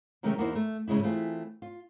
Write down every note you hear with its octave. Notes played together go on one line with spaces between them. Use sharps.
C3 D#3 F#3 G#3 A3 C#4
E2 A#3 D#4 E4 F#4 C5
A3
G#2 C#3 F3 G#3 E4
E3 A3 C4 F4 G#4
F4